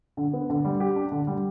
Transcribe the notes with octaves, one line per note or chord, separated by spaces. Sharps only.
D3
B3
D3
G3
G4
D4
D3
G3